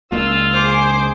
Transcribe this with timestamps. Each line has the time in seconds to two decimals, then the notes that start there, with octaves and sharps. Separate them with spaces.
0.12 C#2 C#3 A#3 F4 E6
0.53 G#4 C5 D6